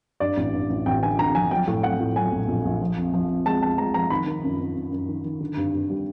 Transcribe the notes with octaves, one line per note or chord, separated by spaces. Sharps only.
G2 D5
A1
G2
A1
A1 G5
D3 G#5
D3 A#5
F3 G#5
F#3 G5
A2
F#3 F#5
A2
F#3 G#5
A#1
A#1
A#1
F3
F2
F3
F2
G#3 A5
F2 A5
G#3 A#5
F3 A#5
D#3 B5
D#3
F#2
F#2
F#2
F#2
D#3
D#3
D3
G2
G2
G3